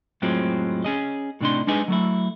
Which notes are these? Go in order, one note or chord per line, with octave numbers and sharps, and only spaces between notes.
F2 A2 F3 F#3 G#3 C4
C#4 G#4 D#5
A2 C3 D4 D#4 C6
G#3 D4 D#4 G#4 B4 D#5
F#3 A3 E4